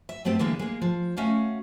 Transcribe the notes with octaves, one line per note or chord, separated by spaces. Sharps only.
E5
G2 A3 B3 C4 G4
D3 E3 G3 G#3 A#3
G#3 A#3
F3
A3 C#4 F#4 F5 F#5